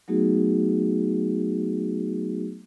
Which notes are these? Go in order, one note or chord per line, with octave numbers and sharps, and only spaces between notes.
F#3 A3 B3 D#4 F#4 G#4